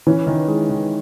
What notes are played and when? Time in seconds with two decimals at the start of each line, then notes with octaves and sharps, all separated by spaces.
0.07 E3 C#4
0.27 D#3
0.48 G#3
0.69 D#3